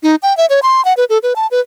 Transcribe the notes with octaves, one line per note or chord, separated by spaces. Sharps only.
D#4
G5
E5
C#5
C6
F#5
B4
A4
B4
A5
B4